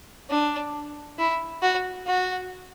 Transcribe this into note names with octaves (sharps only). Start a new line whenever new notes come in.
D4
E4
F#4
F#4